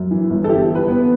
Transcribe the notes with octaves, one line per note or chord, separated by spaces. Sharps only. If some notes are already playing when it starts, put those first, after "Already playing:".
Already playing: F#2
E3
G1
A4
E4 G4
E3
B4
B3